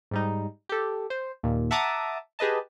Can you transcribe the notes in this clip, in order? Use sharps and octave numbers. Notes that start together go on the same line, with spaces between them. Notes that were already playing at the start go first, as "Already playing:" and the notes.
G#2 G3 D#4
G4 A4
C5
D#2 A#2
E5 F#5 A5 A#5 D6 D#6
G4 G#4 B4 D#5 A5